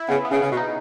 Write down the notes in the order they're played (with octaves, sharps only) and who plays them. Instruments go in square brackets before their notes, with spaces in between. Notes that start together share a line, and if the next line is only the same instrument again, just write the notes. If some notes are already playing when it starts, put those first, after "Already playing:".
Already playing: [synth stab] E4
[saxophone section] C#3 [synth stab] B3
[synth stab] B3
[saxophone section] C#3
[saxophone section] C#3 [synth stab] B3
[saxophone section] B2
[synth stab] D#4